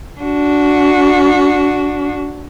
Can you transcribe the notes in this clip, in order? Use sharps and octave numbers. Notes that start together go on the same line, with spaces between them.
D4 F#4